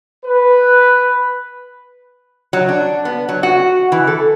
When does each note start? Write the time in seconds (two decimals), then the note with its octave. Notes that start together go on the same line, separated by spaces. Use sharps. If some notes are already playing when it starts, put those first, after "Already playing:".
0.25 B4
2.53 F#3
2.69 D4
3.05 B3
3.29 F#3
3.43 F#4
3.92 E3
4.07 A4